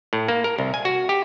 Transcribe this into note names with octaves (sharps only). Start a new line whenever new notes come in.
A2
A#3
A#4
C2
G#5
F#4
G4